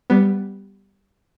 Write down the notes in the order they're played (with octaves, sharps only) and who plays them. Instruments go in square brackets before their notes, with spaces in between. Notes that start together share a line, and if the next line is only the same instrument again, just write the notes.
[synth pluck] G3 B3